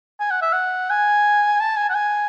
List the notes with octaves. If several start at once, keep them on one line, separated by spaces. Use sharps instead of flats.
G#5
F#5
E5
F#5
G#5
A5
G#5
F#5
G#5